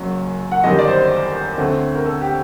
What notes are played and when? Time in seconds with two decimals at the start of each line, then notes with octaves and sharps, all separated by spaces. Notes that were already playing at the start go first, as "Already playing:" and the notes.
Already playing: F#1 F#2 F#3
0.52 F#5
0.64 G1 F#2 D#3 G3 D#5
0.79 D5
0.87 C5
1.58 D2 D3 A3 C4
1.95 A#4
2.05 A4
2.22 G4